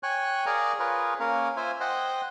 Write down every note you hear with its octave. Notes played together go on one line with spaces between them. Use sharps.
C#5 G5 G#5 C#6 F#6
G#4 A#4 D5 F5 G#5 A#5
F4 G#4 A#4 B4 C#5
A#3 C#4 A#4 F5
F4 C5 E5 G#5
C5 D#5 F#5 G5 C6